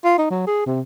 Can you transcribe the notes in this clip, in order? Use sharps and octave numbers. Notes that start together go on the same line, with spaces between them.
F4
D#4
F#3
G#4
C3